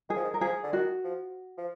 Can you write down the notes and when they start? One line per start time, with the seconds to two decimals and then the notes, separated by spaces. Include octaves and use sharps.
0.09 D#3 G#4
0.16 F3
0.24 D#3
0.34 A#4
0.41 F3 G#4
0.63 D3
0.73 D#3 F#4
1.04 F3
1.58 F3